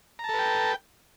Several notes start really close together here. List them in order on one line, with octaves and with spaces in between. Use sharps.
A#5 A5 A4 B4 G5